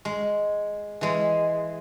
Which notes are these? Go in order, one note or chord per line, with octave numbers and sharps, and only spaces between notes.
G#3
E3 G#3